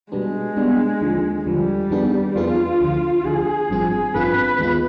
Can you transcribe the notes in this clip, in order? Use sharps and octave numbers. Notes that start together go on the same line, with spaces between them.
B2 G3 G#3 B3 D4
B2 G3 B3 D4
D#2 D3 F3
D#2 D3 F3 G3
F2 D#3 B3 D4 G#4
F2 D#3 B3 D4 F4 G#4
D2 D3 F3
D2 D3 F3 G#4
G#1 G2 F3 C4 F4
G#1 G2 F3 C4 F4 B4
D#2 D#3 G#3 B3 F4